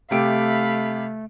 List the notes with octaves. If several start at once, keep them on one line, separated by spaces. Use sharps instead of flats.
C3 A3 G4 F5 B5 D7